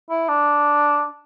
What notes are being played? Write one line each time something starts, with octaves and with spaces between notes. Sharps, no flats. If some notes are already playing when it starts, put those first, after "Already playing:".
E4
D4